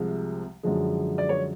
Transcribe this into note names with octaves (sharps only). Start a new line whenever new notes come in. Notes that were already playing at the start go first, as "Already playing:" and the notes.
Already playing: C2 C3 F3 G#3
F#2 D3 F3 G#3
D5
C#5